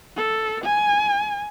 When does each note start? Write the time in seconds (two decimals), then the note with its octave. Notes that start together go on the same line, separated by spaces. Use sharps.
0.17 A4
0.64 G#5